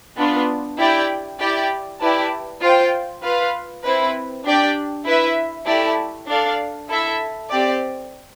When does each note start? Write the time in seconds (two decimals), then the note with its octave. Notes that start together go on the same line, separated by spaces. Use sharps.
0.18 B3 D4 F4
0.79 E4 G4 D5 G5
1.40 E4 G4 D5 G5
2.00 E4 G4 B4 D5 A5
2.61 F4 C5 G5
3.22 F4 B4 F5
3.84 C4 E4 B4
4.44 D4 G4 D5 G5
5.06 E4 B4 E5
5.66 A3 E4 G4 D5 A5
6.27 D4 A4 D5 F5
6.89 E4 A4 E5
7.49 C4 G4 D5